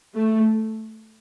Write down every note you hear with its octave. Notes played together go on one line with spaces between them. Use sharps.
A3